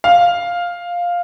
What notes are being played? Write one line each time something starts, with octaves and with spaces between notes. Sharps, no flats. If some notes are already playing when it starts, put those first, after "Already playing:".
F5